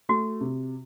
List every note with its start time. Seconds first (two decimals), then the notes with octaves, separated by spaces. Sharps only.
0.09 A3 F#4
0.41 C3